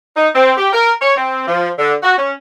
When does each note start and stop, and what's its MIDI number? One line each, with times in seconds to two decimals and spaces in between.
0.16 0.28 63
0.35 0.52 60
0.57 0.69 67
0.73 0.92 70
1.01 1.15 73
1.16 1.43 60
1.47 1.69 53
1.79 1.94 50
2.03 2.14 66
2.18 2.32 61